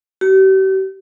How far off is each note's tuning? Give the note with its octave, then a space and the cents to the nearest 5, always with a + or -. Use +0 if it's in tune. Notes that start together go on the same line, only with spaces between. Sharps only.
G4 -40